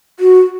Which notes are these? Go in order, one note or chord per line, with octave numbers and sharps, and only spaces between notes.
F#4